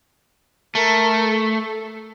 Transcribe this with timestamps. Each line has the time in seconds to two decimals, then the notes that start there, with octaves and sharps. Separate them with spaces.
0.75 A3 A#4
1.28 A4